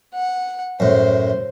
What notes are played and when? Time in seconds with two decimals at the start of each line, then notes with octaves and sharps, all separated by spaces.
0.14 F#5
0.80 F#2 A2 C5